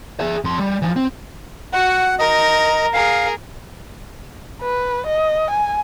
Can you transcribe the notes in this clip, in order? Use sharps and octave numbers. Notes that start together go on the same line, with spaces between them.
G#4 E5
F2 C6
G3
E3 F3
C4
F#4 F#5
A#4 D#5
G#4 A#4 F5
B4
D#5
G#5